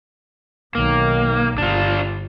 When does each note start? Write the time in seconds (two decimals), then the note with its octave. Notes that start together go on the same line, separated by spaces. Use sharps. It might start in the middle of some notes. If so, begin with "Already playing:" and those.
0.75 B1 D#3 A#3
1.58 G1 D4 F4